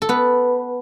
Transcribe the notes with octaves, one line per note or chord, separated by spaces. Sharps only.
A4
B3 B4